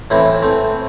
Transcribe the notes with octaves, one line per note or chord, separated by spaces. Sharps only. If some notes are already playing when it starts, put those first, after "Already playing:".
A2 E3 C4 E4
A3 C4